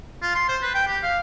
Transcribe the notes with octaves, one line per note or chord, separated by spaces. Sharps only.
F4
C6
C5
B4
G5
G4
F5